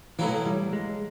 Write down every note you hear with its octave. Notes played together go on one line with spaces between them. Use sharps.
B1 A2 E3 F#3 A#3
G3
G#3